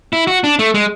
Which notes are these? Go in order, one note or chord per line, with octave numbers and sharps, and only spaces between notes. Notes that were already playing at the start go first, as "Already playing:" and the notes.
E4
F#4
D4
A3
G#3